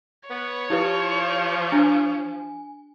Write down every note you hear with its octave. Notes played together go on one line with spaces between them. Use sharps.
B3 C#5
F3 E4 G4 B4
D4 G#5